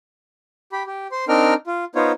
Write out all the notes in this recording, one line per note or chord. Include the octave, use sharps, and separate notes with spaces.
G4 B5
G4
C5 C6
C4 D4 D#4 A#4 G5 F6
F4
B3 D#4 F4 C5 C#5